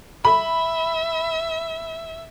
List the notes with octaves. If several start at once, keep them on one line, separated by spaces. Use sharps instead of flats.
E5 B5